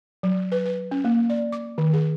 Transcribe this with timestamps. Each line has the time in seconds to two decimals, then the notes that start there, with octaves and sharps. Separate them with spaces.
0.23 F#3
0.52 B4
0.66 B4
0.91 C#4
1.05 A#3
1.30 D5
1.52 D6
1.78 D#3
1.93 G#4